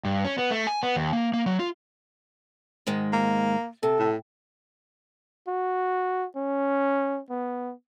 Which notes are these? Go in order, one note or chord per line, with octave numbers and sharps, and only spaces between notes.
G2
C#4
B3
A3
G#5
B3
D#2
A#3
A#3
F#3
F4
G#2 D#3 G#3
A#3
C3 A4
A2
F#4
C#4
B3